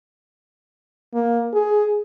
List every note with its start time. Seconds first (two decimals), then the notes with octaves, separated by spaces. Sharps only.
1.14 A#3
1.54 G#4